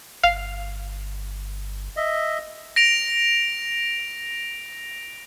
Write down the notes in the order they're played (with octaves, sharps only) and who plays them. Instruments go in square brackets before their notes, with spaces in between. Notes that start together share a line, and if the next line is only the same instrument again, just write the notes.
[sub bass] G1 [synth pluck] F5
[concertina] D#5 E5
[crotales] A#6 D7 F7